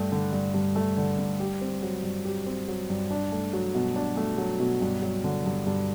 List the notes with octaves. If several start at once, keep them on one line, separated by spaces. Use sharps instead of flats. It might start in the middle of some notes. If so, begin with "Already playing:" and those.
Already playing: G2 A3
D3
G2
G2
A3
D3
G2
G4
C4
F#3
G2
G4
C4
F#3
G2
D4
A3
F#3
B2
D4
A3
F#3
B2
G2
F#3
D3
G2
G2